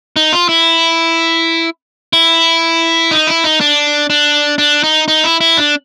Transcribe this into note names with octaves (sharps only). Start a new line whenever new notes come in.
D#4
F4
E4
E4
D#4
E4
D#4
D4
D4
D4
D#4
D#4
E4
E4
D4